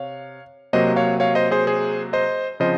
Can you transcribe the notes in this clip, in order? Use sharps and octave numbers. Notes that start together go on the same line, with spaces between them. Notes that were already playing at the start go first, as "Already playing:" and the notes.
Already playing: C3 C#5 F5
C3 F#3 A#3 C5 D#5
C#5 F5
C#5 F5
C5 D#5
G#4 C5
G#4 C5
C5 D#5
C#3 F3 C4 C5 D#5